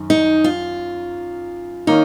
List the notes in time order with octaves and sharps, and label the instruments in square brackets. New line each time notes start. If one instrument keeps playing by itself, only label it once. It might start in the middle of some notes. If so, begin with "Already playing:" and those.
Already playing: [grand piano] F#2 D#3
[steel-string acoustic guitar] D#4
F4
[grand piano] D#3 A#3 C#4 [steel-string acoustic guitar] D#4